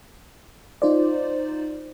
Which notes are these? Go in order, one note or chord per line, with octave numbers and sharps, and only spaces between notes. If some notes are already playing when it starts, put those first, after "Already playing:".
D#4 F4 C5 D5